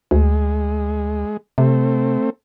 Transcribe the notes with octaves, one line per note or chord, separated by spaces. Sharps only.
D2 G#3
C3 A3 C4